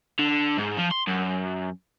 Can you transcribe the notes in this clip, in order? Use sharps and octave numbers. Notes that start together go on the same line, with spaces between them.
D3
G#2
F3
C6
F#2